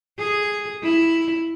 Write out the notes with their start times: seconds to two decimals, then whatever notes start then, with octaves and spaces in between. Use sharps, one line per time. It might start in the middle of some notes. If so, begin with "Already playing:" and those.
0.18 G#4
0.83 E4